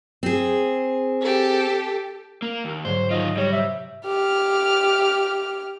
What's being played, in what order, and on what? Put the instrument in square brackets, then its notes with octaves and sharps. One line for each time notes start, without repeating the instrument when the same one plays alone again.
[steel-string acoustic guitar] C4 G#4
[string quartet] G4 A4
[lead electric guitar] A#3
[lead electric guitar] D#2 [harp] C#7
[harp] G#2 D3 F#3 [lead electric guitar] C5
[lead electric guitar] D#3 F4 [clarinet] D#5
[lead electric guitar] G3 [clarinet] C#5 [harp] D#5 E6 A#6
[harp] C3 [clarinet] E5
[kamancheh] G4 F6